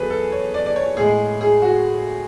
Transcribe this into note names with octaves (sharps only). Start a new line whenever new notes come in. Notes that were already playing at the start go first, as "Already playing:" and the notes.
Already playing: E2 F#3 G#4 A4 B4
A4
C#5
D5
D5
C#5
A2 G#3 G#4
G#4
F#4